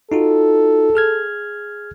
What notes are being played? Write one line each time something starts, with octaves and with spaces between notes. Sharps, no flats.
D#4 F4 F#4 A4
G#4 F6 G#6